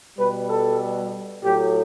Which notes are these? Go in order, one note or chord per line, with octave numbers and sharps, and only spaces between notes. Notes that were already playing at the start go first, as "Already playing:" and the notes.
B2 G3 B4
A4
A2 F#3 A3 G4